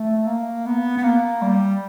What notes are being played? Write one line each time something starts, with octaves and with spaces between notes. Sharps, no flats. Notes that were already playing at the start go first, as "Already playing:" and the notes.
Already playing: A3
A#3
B3
B3
A#3
G3